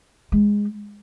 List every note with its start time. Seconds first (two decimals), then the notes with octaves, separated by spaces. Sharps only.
0.32 G#3